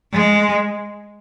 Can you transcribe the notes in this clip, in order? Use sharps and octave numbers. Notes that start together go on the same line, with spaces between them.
G#3